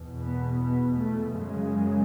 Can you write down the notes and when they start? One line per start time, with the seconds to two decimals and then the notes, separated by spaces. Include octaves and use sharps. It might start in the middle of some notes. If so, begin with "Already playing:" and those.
Already playing: E2 B2
0.22 B3
0.59 B3
0.96 A3
1.32 F#2 C#3 G#3